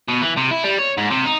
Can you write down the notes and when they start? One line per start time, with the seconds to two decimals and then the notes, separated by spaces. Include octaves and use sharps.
0.08 B2
0.22 E3
0.37 C3
0.51 E4
0.64 G3
0.79 C#5
0.98 G#2
1.11 C3
1.26 D#4